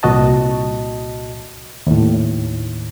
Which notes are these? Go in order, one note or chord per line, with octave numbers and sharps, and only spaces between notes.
C2 A#2 F#4 D#5 A5
D#2 A2